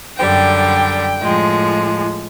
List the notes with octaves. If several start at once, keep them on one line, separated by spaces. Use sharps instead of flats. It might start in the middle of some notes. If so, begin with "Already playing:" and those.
F#2 D3 G3 G5
A2 F3 G#3